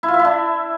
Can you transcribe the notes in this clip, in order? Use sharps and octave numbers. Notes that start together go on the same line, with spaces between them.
E4
F4
E5
E4
D4